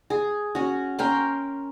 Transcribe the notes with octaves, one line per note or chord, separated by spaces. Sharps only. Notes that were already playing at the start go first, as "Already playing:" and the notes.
G#4
C#4 F#4
C#4 A#4 G5 C6